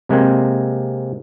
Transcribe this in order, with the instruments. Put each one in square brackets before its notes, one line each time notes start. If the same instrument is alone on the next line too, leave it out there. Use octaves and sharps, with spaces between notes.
[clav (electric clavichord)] C3 G#3 A#3 C4